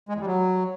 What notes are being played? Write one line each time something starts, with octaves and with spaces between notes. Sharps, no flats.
G#3
E2
G3
F#3